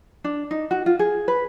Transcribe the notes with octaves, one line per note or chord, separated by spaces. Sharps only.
D4
D#4
F#4
F4
G#4
B4